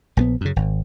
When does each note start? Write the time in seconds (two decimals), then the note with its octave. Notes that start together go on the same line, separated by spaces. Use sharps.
0.17 A#1 F3 B3
0.41 F#2 C#3
0.56 G#1